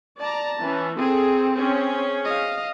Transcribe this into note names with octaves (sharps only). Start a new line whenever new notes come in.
D5 A5 A#5
E3 C#4
C4 G#4 A4
C#4 G#4 C5
D#5 F5